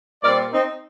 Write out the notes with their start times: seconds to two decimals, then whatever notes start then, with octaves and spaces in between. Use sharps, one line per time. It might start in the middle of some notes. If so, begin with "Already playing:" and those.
0.23 A#2 G3 C4 A#4 D5
0.52 C4 D#4